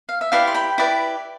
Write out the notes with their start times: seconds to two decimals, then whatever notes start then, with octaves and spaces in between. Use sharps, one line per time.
0.09 F5
0.21 E5
0.32 E4 G4 B4 D5 F5
0.47 C6
0.54 G5 B5
0.78 E4 G4 B4 D5